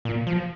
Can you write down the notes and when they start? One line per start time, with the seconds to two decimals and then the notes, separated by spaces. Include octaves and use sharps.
0.05 A#2
0.27 F3